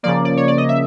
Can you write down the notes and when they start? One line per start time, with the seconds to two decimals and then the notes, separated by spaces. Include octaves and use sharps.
0.03 C#3 F3 A#3 D5
0.25 D5
0.37 C#5
0.48 D5
0.58 D#5
0.69 E5